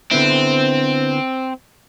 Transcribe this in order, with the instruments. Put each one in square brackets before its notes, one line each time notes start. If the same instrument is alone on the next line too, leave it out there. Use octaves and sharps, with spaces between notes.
[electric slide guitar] D3 B3 E4 [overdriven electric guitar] C4